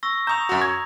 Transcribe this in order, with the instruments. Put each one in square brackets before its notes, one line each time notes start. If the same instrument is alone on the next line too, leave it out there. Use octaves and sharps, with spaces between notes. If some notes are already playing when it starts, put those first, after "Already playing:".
[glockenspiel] C#6 E6 A#6
[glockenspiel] A#5 D#6 F7 [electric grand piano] C#6 G6
[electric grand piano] F#2 F#4
G#6